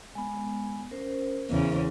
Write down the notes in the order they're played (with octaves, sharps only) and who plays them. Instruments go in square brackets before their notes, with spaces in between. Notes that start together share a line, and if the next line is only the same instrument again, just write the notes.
[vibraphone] G#3 B3
C#4 A#4 C5
[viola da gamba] E2 C#3